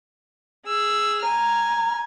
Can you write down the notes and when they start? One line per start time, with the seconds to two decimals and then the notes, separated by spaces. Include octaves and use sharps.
0.66 G#4 E6
1.23 G#5 A#5 F6